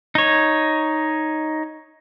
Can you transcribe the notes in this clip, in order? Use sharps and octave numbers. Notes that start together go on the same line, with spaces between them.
D#4 C#5